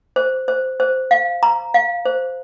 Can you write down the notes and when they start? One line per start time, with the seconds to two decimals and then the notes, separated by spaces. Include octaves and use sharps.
0.16 C5
0.48 C5
0.80 C5
1.11 F5
1.43 A#5
1.74 F5
2.05 C5